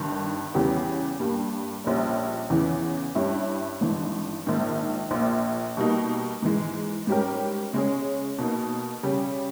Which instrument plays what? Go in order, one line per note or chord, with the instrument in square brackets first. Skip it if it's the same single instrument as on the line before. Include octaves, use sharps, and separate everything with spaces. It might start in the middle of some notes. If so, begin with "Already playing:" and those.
Already playing: [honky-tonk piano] G1 G2 D#3
E2 C#3 G3 B3 G4
G2 G3 A#3
A#1 A#2 G3 C#4
E2 C#3 E3
G2 G3 C#4 E4
G#1 G2 E3
A#1 G#2 D#3 A#3
A#1 A#2 A#3
B2 G3 A#3 D#4
G#2 E3 G#3
G#2 G3 C#4 G4 A#4
C#3 G#3 C#4 G#4
B2 A#3 D#4
C#3 G3 C#4